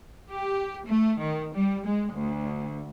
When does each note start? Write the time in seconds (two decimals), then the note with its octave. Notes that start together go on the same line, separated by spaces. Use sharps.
0.31 G4
0.85 A3
1.20 D#3
1.55 G3
1.85 G#3
2.14 D2